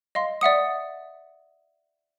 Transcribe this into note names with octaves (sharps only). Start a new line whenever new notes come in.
D#5 F5 C6
D5 E5 F#5 D#6